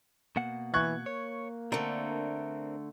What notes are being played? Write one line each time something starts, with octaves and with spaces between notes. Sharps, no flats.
B2 A#3 F#5
E3 C#6 F#6 G#6
A#3 C#5
D3 A3 C4 D4 A#4